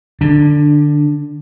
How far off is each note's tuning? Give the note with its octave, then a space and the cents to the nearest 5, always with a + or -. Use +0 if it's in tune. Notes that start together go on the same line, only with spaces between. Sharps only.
D3 +15 D4 +0